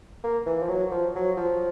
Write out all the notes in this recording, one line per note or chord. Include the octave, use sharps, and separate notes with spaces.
A#3
E3
F3
F#3
F3
F#3
F3